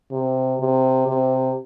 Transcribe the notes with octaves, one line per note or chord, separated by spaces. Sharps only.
C3
C3
C3